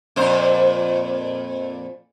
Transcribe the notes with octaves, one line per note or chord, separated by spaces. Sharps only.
F2 A#2 C5